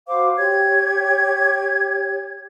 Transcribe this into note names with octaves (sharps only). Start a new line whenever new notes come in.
F#4 C5 F5 D6
G4 C#5 G#6